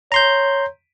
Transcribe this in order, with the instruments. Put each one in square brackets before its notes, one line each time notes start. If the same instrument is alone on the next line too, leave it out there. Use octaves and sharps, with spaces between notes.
[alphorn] C#5 [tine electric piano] A#5 C6 G6